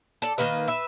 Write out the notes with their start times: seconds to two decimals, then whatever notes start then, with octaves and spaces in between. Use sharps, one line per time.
0.22 A4 D5
0.38 D#3 A#3 B4 D#5
0.67 B4 E5